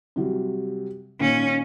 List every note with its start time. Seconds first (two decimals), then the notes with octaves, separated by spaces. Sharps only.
0.16 C3 F#3 G3
1.21 A#2 D#3 C#4